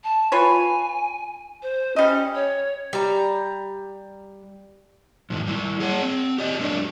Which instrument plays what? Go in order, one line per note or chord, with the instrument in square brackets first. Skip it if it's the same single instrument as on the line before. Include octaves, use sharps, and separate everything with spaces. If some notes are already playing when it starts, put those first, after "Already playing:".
[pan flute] A5
[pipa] F4 B4 C#5 [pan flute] G#5
[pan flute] C5
[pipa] G3 D#5 [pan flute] C#4
[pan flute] C#5
[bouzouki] G3 A#5
[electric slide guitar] F2 G#2 D#3
G3 E4
G#4 C#5 F#5
C4
G4 D5 D#5
F#3 G#3 D4 A#4 D5